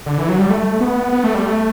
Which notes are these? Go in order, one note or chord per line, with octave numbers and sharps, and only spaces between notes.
D3
E3
F#3
G3
A3
B3
B3
A3
G3
A3